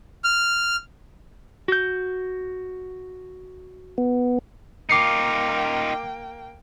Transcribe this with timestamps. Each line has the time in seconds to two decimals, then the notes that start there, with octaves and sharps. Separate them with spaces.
0.24 F6
1.68 F#4 G6
3.98 B3
4.89 A#3 D#4 F4 G5 D6 C7 C#7